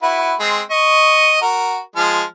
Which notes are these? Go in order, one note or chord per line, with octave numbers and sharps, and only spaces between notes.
E4 F#4 B4
G#3 C4
D#5 C#6
F#4 A#4
F3 G#3 F6